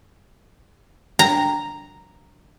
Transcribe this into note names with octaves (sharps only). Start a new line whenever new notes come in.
A#5